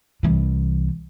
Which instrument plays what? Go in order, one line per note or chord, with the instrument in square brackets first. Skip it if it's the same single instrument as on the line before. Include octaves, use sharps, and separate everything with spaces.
[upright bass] C2 E3